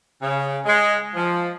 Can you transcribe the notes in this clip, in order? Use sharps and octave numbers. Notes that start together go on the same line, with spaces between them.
C#3
G#3
F3